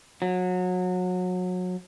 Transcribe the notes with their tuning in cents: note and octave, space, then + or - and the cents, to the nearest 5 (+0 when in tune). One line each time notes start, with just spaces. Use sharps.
F#3 -25